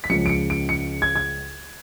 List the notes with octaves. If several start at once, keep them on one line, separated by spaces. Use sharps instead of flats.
B6
C#2 C#3 F3 C#7
D7
C#7
D7
C#7
G#6
G#6